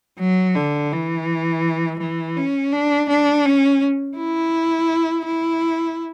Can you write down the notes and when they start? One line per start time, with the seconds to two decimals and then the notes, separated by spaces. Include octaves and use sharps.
0.19 F#3
0.55 D3
0.92 E3
2.00 E3
2.37 C#4
2.72 D4
3.09 D4
3.45 C#4
4.17 E4
5.26 E4